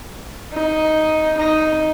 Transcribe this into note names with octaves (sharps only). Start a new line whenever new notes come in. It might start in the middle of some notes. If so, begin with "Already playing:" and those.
D#4
D#4